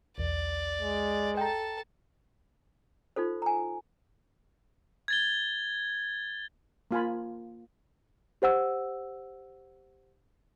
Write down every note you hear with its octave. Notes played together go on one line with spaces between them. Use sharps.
B1 E2 D5
G#3
A4 G5 A5 A#5
D#4 F4 A4 C5
G#5 A#5
G#6 A6 G7
A#3 F4 G#5 B5
G4 C5 F#5 E6